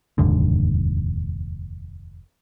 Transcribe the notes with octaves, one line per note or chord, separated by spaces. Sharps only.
F1 D#2 G#2 D3